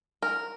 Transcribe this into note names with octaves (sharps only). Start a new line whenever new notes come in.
A#4